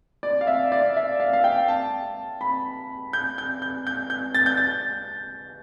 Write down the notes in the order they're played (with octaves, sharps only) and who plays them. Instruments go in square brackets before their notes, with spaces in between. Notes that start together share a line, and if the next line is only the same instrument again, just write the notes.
[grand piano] D5
F5
E5
D5
E5
F5
F5
G5
A5
B5
G6
G6
G6
G6
G6
A6
G6
A6